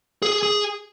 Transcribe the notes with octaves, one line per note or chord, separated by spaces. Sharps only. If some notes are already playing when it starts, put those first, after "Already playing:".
G#4
G#4